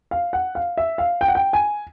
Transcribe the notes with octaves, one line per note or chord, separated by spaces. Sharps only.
F5
F#5
F5
E5
F5
G5
F#5
G5
G#5